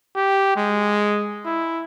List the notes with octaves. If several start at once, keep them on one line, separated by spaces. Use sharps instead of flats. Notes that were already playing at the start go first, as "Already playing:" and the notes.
G4
G#3
E4